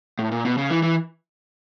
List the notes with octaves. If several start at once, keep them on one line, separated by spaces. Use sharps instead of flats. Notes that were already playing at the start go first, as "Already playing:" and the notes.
A2
A#2
B2
C#3
E3
E3